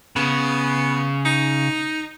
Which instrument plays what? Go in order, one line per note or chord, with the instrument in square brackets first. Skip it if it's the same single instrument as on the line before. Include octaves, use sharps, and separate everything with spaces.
[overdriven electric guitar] C#3 [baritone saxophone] B3
[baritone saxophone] D#4